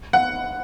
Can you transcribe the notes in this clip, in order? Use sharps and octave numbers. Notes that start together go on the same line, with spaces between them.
F#5